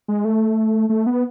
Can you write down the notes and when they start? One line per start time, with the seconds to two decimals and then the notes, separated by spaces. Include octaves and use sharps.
0.08 G#3
0.25 A3
0.89 A3
1.06 B3